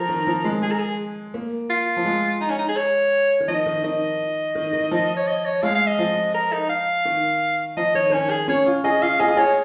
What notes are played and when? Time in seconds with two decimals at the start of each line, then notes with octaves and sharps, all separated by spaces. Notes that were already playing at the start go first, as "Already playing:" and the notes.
Already playing: F3 A#4
0.09 D#3
0.27 F3
0.44 G#3
0.62 G#4
0.71 A#4
0.79 G#4
1.34 A#3
1.70 F4
1.97 F3
2.05 G#3
2.41 D#4
2.49 C#4
2.59 D#4
2.68 G#4
2.76 C#5
3.40 D#3
3.48 F3 D#5
3.66 D#3
3.84 D#3 D#5
4.55 D#3
4.73 D#3
4.91 F3
5.16 C#5
5.27 D#5
5.45 C#5
5.63 G#3 F5
5.75 F5
5.87 D#5
5.99 F3
6.34 A#4
6.52 D#4
6.69 F5
7.05 D#3
7.77 F3 D#5
7.95 D#3 C#5
8.10 D#3 C#4
8.30 G#4
8.48 C#4 C#5
8.66 F4
8.84 G#4 D#5
9.02 F4 F5
9.20 G#4 D#5
9.28 F4
9.37 G#4 C#5